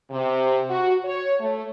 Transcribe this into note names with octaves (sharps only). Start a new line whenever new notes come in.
C3
F#4
C#5
A3